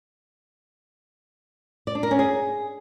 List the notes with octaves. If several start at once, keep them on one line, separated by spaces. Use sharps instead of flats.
D5
D4
A#4
C#4
G#4